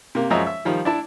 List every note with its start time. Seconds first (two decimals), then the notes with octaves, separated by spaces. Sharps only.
0.15 C3 A#3
0.30 F#2 F3 G#3 D#5 E5 A#5
0.47 E5
0.65 D#3 F3 G3
0.85 D4 E4 A5